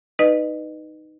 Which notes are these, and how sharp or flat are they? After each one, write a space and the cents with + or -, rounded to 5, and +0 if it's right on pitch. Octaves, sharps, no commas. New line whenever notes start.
D#4 +0 B4 +0 D#5 -30